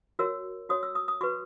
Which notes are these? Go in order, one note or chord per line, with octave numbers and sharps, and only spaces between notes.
F#4 A#4 C#5 E6
F#4 C#5 D#6
E6
D#6
D#6
F#4 B4 C#6